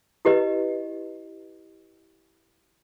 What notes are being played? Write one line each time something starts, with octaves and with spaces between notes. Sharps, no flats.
E4 G4 B4 D#5